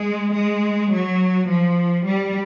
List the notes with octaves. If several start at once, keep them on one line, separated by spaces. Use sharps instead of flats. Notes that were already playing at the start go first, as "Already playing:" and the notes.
Already playing: G#3
G#3
F#3
F3
G3